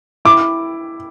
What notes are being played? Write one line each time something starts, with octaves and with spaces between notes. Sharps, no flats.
E4 D6